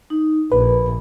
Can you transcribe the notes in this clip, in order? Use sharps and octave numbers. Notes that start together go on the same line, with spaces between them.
D#4
A#1 B4 B5